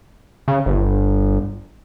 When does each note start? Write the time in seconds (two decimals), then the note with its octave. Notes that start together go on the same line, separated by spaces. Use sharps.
0.48 C#3
0.66 G1